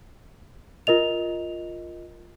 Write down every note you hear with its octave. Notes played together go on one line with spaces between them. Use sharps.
F4 A#4 D#5 F7